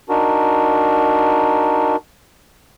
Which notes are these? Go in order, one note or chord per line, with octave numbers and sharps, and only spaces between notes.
D4 D#4 F#4 A#4